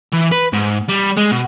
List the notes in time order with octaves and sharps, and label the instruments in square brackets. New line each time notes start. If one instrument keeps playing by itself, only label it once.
[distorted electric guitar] E3
B4
G#2
G3
G#3
B2